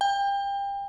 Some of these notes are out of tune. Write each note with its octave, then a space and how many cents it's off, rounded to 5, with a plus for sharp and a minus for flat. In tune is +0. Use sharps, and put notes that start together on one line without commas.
G5 +30